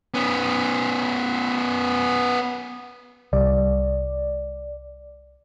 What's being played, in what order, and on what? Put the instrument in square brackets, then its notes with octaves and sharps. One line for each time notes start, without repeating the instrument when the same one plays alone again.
[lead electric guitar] B3 C#4
[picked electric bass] C2 G3 [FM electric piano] D5